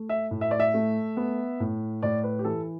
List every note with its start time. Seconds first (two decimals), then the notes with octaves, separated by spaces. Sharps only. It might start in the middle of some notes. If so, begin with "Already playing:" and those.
Already playing: A3
0.09 E5
0.31 A2
0.41 E5
0.51 D5
0.60 E5
0.74 A3
1.17 B3
1.60 A2
2.03 A2 D5
2.24 B4
2.39 G4
2.45 E3 A4